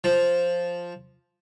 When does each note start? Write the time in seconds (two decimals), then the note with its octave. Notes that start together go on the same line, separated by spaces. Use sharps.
0.04 F3